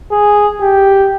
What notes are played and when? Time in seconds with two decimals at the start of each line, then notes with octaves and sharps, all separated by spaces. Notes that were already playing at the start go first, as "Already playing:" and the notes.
0.11 G#4
0.61 G4